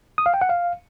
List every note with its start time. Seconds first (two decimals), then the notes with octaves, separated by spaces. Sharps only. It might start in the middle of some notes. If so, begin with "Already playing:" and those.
0.18 D#6
0.26 F5
0.34 G5
0.41 F#5
0.49 F5